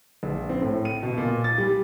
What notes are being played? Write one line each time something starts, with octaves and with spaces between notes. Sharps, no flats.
A#1
C4
A2
D#7
B2
A#2
A6
G3